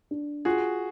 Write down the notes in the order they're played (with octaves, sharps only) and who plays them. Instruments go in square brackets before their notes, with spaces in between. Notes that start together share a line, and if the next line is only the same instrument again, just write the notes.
[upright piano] D4
[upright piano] F4 [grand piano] F#4 G#4